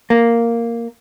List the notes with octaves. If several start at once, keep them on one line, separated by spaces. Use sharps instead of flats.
A#3